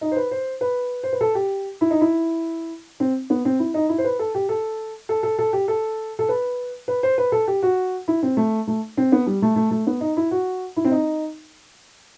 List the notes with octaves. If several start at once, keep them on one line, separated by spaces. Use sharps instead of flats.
D#4
C5
B4
C5
B4
C5
B4
A4
G4
E4
D#4
E4
C4
B3
C4
E4
D#4
E4
C5
B4
A4
G4
A4
A4
A4
A4
G4
A4
A4
B4
B4
C5
B4
A4
G4
F#4
E4
C4
A3
A3
C4
B3
G3
A3
A3
A3
B3
D#4
E4
F#4
E4
C4
D#4